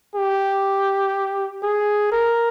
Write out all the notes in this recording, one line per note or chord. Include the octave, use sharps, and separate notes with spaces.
G4
G#4
A#4